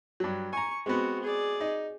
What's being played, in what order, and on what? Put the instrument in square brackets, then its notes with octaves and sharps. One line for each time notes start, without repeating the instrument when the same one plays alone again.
[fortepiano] G2 F#3
[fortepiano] G#5 A#5 [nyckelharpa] C#6
[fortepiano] G#3 B3 [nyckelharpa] C4 F#4
[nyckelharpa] G#4 D5
[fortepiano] D#4